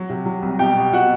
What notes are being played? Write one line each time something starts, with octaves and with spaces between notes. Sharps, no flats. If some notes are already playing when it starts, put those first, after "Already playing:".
Already playing: F#3
C3
F#3
C2
B2 G4 G5
B2
B2 F#4 F#5